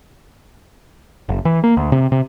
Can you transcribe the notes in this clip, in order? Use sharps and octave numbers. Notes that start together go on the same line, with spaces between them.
F#1
E3
A#3
D2
C3
C3